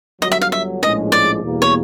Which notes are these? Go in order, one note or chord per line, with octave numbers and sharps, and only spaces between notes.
G1 G2 D3 F#3 D#5
E5
F5
E5
A#1 A2 F3 G#3 C#4 D#5
D5
E2 B2 G3 A#3
C#5